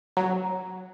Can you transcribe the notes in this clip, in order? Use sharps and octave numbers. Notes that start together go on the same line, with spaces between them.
F#3 A#5